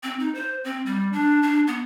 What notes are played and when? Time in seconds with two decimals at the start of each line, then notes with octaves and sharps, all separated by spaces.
0.03 C4
0.19 D#4
0.35 C5
0.64 C4
0.86 G3
1.13 D4
1.43 D4
1.67 B3